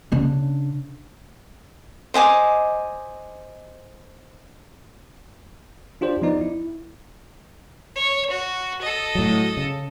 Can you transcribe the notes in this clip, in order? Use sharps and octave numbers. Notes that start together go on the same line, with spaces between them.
C#3 D4
C5 D#5 G#5 D6
D4 F4 G4 C5 D5
F3 B3 D#4 D5
E4
C#5
F#4
A4 D#5
A2 F#3
C#3